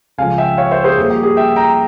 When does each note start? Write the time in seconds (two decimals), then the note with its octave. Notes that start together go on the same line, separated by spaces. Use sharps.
0.18 C#2 C#3 F3 F5 G#5
0.38 E5 G5
0.58 C#5 F5
0.71 C5 E5
0.84 G#4 C5
0.98 G2 F3 A#3 G#4
1.10 G4
1.23 G#4
1.37 E5 G5
1.56 G5 A#5